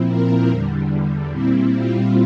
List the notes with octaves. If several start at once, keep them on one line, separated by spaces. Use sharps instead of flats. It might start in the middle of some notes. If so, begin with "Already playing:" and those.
Already playing: A#2 F3 C4 E4
A#4
E2 D3 G3
A#2 G3 C4 E4
F4